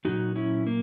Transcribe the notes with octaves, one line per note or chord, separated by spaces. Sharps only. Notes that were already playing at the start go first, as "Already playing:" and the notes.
A#2 F#3 D#4 F#4
C#4 E4
A#3